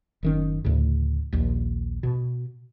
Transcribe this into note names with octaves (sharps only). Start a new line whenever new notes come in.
F#1 D#3 C#4
D2 A2 C#3
A#1 D#2
B2